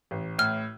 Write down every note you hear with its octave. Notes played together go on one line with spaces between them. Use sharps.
A1
A2 F6